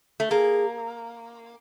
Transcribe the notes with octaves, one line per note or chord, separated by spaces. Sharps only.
A3
A#3 G#4